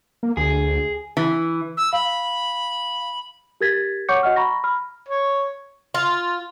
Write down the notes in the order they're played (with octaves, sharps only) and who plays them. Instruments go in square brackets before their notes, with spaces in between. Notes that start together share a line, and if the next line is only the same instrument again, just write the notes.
[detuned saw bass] A#3
[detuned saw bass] D2 [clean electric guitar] G#4
[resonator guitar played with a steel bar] E3
[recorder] E6
[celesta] F5 [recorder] B5
[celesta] G4 A#4 G#6 A6 B6
C#5 F#5 C#6 D6 G6 C#7
F#4 D#5 F#5 F6
A#5 B5 C#6 A#6
B5 F6
[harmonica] C#5
[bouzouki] F4